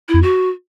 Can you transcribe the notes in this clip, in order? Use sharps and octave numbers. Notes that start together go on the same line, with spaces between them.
E4
F2
F#4